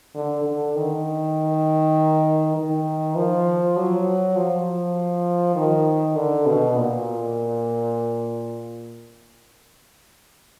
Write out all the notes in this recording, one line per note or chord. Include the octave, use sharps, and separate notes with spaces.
D3
D3
D#3
D#3
F3
F#3
F3
D#3
D3
B2
A#2